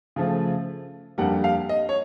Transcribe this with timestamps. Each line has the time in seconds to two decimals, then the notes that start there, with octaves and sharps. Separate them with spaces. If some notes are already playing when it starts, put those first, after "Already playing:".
0.16 C#3 F3 A3
1.18 F2 D3 G3 A#3 F#5
1.44 F5
1.69 D#5
1.89 C#5